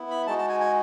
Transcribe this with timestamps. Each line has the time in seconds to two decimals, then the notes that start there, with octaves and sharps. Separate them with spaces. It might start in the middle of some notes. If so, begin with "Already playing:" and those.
Already playing: B3 E4
0.11 B5
0.27 G#3 D#4 F#4 A5
0.38 A5
0.49 G#5
0.60 G#5